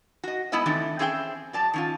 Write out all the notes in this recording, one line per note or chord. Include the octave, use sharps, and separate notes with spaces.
F#4 D#5
G#3 A3 B3 E4 D#5 E5
D#3 E3 A3 C4 D4
C4 C#4 G#4 E5 F5 G5
F#3 D5 A5
D#3 C#4 F4